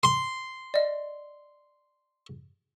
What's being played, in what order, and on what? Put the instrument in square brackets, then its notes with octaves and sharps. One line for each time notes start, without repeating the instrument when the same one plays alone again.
[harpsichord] C6
[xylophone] D5 D#5